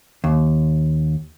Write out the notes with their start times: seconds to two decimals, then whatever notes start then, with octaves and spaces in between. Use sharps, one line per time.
0.24 D#2